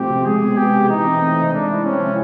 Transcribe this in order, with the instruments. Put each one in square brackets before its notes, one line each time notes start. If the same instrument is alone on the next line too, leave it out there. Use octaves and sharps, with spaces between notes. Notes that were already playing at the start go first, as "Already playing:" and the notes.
Already playing: [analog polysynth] B2 F3 A3 C4 [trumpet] G4
[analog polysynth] C3
[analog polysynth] G#3 [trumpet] G#4
[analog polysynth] B2
[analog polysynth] B3 [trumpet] G4
[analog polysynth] B2
[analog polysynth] E3 [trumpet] D#4
[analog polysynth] C4
A3
C3
[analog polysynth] G#3 [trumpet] D4
[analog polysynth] E4
[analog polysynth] C4 [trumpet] C#4
[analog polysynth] F3